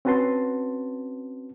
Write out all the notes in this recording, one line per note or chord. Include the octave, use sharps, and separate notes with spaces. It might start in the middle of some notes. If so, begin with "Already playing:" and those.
C4 C#4 F#4 B4 A5 C6